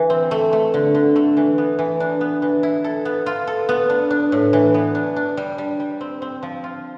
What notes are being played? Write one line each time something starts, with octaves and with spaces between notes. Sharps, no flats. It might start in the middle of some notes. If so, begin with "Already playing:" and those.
Already playing: E3
C4
A3
A3
D3
D3
A3
E3
B3
E3
D4
B3
E3
E4
A4
B3
F4
A4
B3
D4
D4
A2
E3
B3
D4
D4
G3
G3
G3
C4
C4
F3
F4